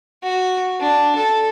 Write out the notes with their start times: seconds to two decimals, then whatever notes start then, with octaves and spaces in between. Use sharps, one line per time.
0.23 F#4
0.80 D4
1.16 A4